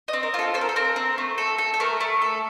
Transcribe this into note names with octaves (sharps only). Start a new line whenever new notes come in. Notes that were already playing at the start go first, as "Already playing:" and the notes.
D#5
C4
A#4
F4 A4
A4 C5
A#4
A4
C4 A#4
C4
A3
A4
A4
A4
A3 A#4
A3
A4